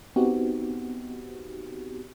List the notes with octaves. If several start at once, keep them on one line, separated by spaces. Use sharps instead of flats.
B3 C4 D#4 F#4 G4